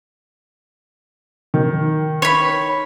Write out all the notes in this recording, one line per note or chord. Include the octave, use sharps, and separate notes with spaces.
D#3
C#5 B5